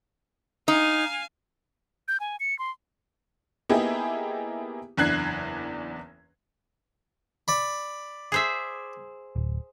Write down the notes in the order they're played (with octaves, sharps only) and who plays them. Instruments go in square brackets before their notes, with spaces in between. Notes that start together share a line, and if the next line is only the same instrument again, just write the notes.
[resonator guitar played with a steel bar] D#4 [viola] F5 G#5
[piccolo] G6
G#5
C#7
C6
[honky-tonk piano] A#3 B3 D#4 E4 G4 G#4
F#1 E2 D4 F#6 G#6 C7
[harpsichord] D5 B5
[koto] G#4 C5 E5
[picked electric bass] D1